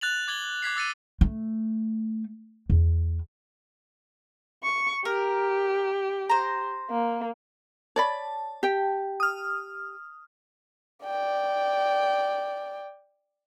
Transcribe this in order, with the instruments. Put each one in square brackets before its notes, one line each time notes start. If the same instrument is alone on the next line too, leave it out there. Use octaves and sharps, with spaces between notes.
[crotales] F#6 A6 F7 F#7
D6 G#6 F#7 G7
D6 G#6 B6 C7
D6 E6 A6 C#7 D#7
[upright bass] A3
E2
[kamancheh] C#6
[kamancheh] G4 [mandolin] A#4
[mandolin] C5 A#5
[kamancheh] A#3
[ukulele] C#5 D5 B5 [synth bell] A5
[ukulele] G4 G5
[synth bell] D#6 F6
[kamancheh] D5 G5